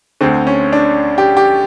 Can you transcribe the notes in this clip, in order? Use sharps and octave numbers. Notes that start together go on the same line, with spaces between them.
D2 D3 C4
C#4
D4
G4
G4